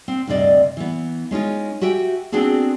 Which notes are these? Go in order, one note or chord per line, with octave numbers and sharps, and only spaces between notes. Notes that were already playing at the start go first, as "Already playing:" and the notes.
C4
D2 G2 C3 D5 D#5
E3 B3
G#3 C#4 D#4 F4
F#4 G4 E5 G5 G#5
B3 C4 D4 F#4 G#4 A4